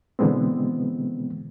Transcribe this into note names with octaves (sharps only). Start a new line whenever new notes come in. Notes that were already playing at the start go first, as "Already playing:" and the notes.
B2 D3 E3 G#3 B3 C4